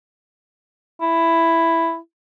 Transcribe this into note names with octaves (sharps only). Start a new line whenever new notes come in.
E4